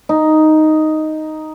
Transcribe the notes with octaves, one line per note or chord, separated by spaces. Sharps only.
D#4